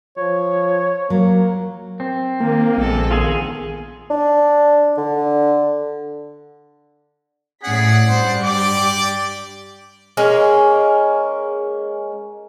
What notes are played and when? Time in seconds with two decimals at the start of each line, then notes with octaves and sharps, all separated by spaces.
0.17 F3 C#5
1.10 F#3 A#3
2.00 C4
2.41 D#3 A#3
2.78 A#1 G#3 B3 A4
3.11 D#3 B3 F4 G#4
4.10 D4
4.98 D3
7.63 A2 C#4 G#4 D5 F#5 B6
8.09 G2 G3 C5
8.43 G4 D5 D6
10.17 G#3 A#3 C#4